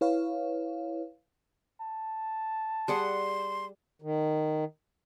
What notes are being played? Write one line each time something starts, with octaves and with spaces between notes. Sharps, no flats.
E4 B4 C#5 F5
A5
G3 G#4 F#5 C6
D#3